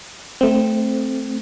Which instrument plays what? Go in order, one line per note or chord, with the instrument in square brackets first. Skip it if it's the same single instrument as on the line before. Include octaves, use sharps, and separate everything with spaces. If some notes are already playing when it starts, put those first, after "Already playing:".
[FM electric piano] A3 C4